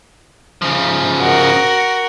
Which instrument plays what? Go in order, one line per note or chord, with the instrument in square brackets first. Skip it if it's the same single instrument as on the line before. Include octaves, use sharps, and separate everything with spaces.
[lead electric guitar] C#3 F3
[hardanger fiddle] F#4 A#4